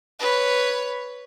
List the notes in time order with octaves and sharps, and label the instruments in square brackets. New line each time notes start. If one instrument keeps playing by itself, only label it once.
[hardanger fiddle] B4 C#5